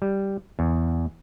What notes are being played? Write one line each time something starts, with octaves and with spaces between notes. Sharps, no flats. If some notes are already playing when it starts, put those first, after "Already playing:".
G3
E2